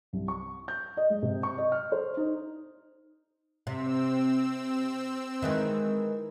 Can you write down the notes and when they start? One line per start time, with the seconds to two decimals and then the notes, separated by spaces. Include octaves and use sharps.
0.13 C2
0.28 C#6
0.68 G6
0.97 D#5
1.10 G#3
1.22 C3
1.43 C#6
1.58 D#5
1.72 F6
1.92 C5
2.17 D#4
3.67 C3 C4 E6
5.42 D#3 E3 G#3